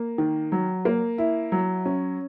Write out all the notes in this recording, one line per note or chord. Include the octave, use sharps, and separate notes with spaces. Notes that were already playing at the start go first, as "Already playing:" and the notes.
Already playing: A#3
D#3
F#3
A#3
E4
F#3
C#4